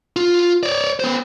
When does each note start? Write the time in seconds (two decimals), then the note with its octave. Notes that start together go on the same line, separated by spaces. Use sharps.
0.16 F4
0.63 C#5 D5
1.00 B3 C5